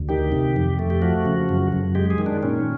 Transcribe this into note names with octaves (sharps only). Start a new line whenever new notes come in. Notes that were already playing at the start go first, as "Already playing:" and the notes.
Already playing: D2
D#3 G4
C3
F2
A3
G4
F3 F#4
C#3
F#2
F#2
G#3 G4
G#4
D#3
D4
A#2 C#4